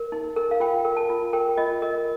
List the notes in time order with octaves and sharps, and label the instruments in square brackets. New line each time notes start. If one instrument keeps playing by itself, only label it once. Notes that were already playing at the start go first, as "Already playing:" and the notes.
Already playing: [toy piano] A#4
D#4
A#4
F5
F4 G5
A#4
A5
F4
A#4 G5
F4 D#5
A#4 D#5